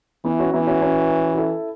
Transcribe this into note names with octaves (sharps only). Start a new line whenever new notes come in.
E3 B3 E4
C#4 F#4
E3 B3 E4
C#4 F#4
C#4 F#4
F#4
E4 A4